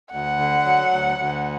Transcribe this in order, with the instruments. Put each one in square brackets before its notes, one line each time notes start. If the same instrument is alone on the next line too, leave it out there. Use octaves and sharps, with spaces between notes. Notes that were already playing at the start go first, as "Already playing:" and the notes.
[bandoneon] D2 [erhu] F#5
[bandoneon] D3
F#3
D2
D2